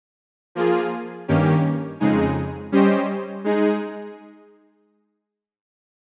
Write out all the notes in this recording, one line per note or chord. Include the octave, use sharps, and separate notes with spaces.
F3 A#3 F4 G#4
G2 D#3 A#3 C#4 G4
F2 C#3 G#3 D#4 G#4
G3 C#4 G4 C5 D#5
G#3 D#4 G#4